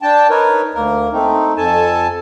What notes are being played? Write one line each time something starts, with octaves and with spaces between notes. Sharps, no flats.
D4 G5 A5
D#4 A#4 B4 C#5
D2 A#3 A#4
A3 C4 D#4
F2 A4 G#5 A5